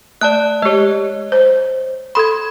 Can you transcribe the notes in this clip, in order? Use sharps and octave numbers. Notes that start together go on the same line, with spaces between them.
A3 D5 A5 F#6
G#3 G4 C#5 D#5
C5
A4 B5 C6 G#6